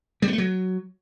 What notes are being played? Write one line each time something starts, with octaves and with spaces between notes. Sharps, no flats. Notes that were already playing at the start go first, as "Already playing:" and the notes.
G3
B3
A3
F#3